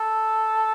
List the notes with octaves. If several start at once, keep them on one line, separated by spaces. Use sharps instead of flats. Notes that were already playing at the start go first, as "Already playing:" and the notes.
Already playing: A4